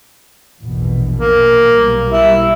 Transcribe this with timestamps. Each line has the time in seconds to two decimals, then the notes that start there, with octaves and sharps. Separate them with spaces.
0.63 A#1 E2 B2
1.17 A#3
1.69 B1 G3
2.11 E4